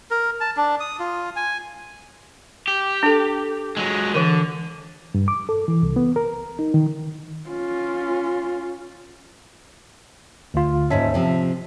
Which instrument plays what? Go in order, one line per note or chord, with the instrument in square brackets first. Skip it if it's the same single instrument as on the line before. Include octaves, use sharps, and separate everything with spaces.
[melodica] A#4
A5
D4
D#6
F4
G#5
[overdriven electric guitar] G4
[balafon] D4 A4
[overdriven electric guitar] F#3 G#3
[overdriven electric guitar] D3 [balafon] E3 A#4
[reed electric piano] G2
D6
A4
E3
C2
B3
A#4
D#4
D#3
[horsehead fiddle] C#4 F4
[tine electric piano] D2 D3 F4
[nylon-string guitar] D#2 G#2 C#4 [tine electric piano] E5 A5 B6
[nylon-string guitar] C3 F3